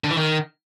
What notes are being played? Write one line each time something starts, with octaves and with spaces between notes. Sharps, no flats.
D3
E3
D#3